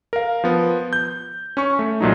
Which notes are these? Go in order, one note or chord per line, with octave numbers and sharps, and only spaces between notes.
A#4 F5
F3 B3
G6
C#4 C#6
A3
C2 A#2 F#3 D#4